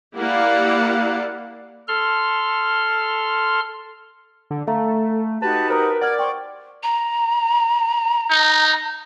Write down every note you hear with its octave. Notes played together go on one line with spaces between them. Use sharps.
A#3 E4 G4 D5 F5 F#5
A4 C6 F6
D3
A3 A4 E5 F5 A#5
D#4 F#4 G4 B4 A5
A#4 C5 A#5 D#6
D5 F#5 F6 G#6
C5 G5 C6 C#6
A#5
D#4